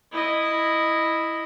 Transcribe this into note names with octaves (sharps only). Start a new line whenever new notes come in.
E4 D#5